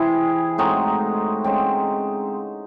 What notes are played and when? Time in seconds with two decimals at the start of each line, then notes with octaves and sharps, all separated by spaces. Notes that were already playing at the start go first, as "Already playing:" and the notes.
Already playing: C3 E3 C4 E4 G#4
0.58 A2 G#3 C4 D#4 F#4
1.44 C#3 G#3 C4